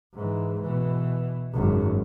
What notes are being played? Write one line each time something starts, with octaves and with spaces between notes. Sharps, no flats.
G#2 E3
B2 E3
G#1 F#2